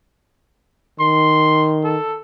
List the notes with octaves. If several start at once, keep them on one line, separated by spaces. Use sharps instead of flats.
D#3 C6
A4